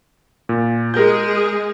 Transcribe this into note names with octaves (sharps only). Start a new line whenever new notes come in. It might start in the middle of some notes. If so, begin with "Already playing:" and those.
A#2
G#3 G#4 A#4 G6